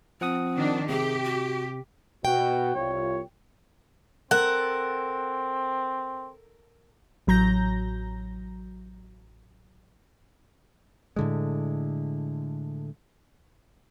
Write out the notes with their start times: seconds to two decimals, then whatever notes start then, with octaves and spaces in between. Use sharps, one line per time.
0.21 F3 C4 F#5 D#6
0.57 D#3 D4
0.89 C3 G4 G#4
1.24 F#4
2.25 B2 F#4 G5
2.76 C2 F4 C#5
4.31 C4 A4 A#4 F#5
7.27 A1 F#3 A#5 G6 A#6
11.16 A2 D3 G#3